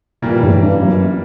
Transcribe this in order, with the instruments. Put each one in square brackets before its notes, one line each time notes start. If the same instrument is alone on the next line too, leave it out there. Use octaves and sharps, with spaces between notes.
[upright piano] A#2 [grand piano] E3 G3 A#3
[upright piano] A2
G2
F#2